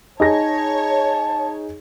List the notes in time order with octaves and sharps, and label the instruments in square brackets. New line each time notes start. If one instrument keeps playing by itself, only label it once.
[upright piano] D#4 G#4 A#6 [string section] C#5 [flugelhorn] A5